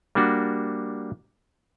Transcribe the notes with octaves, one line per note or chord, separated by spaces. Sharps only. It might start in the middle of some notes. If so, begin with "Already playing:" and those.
G3 A#3 D4 F#4